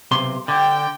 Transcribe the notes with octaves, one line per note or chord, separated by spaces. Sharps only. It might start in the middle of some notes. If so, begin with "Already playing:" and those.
B1 C3 C6
D3 G5